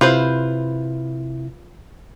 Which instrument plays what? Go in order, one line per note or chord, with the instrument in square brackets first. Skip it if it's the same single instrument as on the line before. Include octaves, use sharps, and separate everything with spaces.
[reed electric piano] C3 E4 [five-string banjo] F4 B4 C5